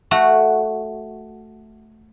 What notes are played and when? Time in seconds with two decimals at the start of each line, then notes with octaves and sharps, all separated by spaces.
0.11 A3 F#4